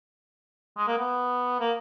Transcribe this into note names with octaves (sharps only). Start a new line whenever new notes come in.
G#3
A#3
B3
A#3